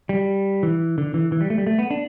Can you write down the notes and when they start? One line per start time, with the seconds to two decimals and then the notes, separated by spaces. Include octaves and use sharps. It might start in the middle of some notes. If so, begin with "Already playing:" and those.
0.09 G3
0.63 E3
0.98 D3
1.14 E3
1.32 E3
1.41 G3
1.50 A3
1.58 G3
1.67 A3
1.79 B3
1.91 D4